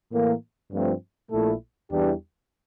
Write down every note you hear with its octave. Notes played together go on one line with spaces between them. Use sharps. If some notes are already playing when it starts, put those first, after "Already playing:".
A2 E3 A#3
G2 F3 A3 C4 F4
A#1 A#2 A3 E4 A4
E2 E3 G3 D4 G4